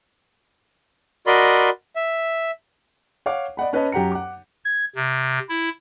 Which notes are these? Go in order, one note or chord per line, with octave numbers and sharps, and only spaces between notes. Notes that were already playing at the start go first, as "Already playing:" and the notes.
F#4 A#4 D5 D#5 B5 C6
E5
C#5 F5 F#5 D6
D5 D#5 F#5 B5
C#4 B4 C#5 D#5 A5
F#2 G4 F#5 A#5 C#7
F#5 D6
G#6
C3
E4